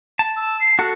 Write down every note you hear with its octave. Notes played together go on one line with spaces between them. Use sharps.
A5
E6
C7
F#4 A4 F#6